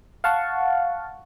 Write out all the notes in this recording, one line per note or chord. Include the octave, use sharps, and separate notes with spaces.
F5 F#5 A5 C#6